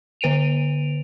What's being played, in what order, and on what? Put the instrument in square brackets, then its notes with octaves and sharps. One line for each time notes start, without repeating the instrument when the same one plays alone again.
[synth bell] D3 B4 D7 D#7 F7